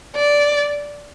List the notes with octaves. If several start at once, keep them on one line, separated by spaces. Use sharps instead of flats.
D5